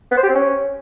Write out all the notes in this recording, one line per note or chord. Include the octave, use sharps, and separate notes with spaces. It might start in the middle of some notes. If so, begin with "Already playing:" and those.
B3
C5
G4
C4
C#4